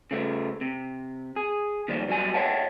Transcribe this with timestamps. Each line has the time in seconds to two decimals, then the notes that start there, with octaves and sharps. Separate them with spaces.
0.11 C#3 A3
0.61 C3
1.36 G#4
1.88 E2 A#2 D#3 F3 G3
2.08 B2 F#3 G3 G#5
2.34 C#5 D#5 E5 F#5 G5 A5